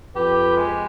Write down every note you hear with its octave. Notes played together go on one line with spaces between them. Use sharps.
F2 G4 B4
G#3